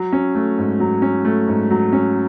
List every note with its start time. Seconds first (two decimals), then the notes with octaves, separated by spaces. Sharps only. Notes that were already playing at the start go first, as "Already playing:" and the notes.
Already playing: F#3
0.12 C#4
0.35 A3
0.58 G#2
0.80 F#3
1.02 C#4
1.25 A3
1.48 G#2
1.71 F#3
1.93 C#4